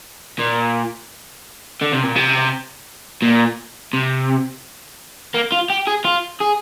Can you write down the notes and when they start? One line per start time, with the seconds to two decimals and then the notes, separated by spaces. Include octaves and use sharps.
0.39 A#2
1.82 D3
1.93 C3
2.04 A#2
2.16 C3
3.22 A#2
3.93 C3
5.34 A#3
5.52 F4
5.70 G4
5.87 G#4
6.05 F4
6.41 G#4